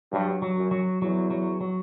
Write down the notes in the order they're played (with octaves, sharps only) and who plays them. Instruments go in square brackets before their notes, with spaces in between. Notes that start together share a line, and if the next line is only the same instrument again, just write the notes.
[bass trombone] G2 [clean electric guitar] F#3
[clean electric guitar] F#3
[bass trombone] F#2
[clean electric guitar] F#3
[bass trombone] E2 [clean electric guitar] F#3
[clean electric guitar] F#3
F#3